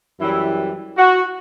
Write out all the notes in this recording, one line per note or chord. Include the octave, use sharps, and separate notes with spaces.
F#2 E3 G3 E4
F#4